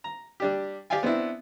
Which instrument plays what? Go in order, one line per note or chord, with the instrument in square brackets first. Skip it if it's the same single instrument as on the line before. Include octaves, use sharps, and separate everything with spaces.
[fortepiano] A#5
G3 D4 G4
G4 D5 F5 G5 G#5
B3 C4 D4 E4